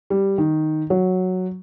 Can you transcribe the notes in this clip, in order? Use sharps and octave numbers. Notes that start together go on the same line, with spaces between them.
G3
D#3
F#3